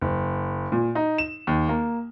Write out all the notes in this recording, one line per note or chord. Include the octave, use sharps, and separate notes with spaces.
F#1
A#2
D#4
E7
D#2
A#3